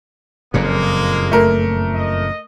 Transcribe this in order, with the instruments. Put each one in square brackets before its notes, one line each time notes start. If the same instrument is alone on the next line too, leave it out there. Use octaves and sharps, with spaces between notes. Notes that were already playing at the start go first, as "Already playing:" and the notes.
[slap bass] F#1 F2 A#2 [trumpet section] G#3 A#3
[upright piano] A3 A#4
[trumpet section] D#5